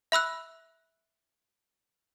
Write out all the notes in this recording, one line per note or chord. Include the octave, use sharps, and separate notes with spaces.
E5 B5 E6 F#6